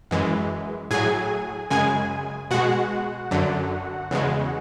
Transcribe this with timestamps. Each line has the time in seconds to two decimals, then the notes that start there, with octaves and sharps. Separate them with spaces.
0.11 F#2 E3 G#3
0.91 A2 F#3 G#4 G#5
1.70 F#2 C#3 G#3 G#4 G#5
2.50 B2 G#3 F#4 F#5
3.31 F#2 D3 F#3
4.11 E2 C#3 G#3